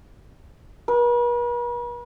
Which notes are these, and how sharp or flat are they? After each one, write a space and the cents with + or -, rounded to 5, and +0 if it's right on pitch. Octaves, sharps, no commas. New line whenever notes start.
B4 -45